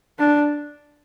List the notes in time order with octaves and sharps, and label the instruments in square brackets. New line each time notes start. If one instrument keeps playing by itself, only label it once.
[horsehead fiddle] D4